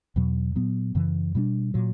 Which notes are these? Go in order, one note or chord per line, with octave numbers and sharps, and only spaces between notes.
E2 B2 F#3
A#2 F#3 B3
F#2 C#3 E3
B2 G3 A#3 D4
A#2 F#3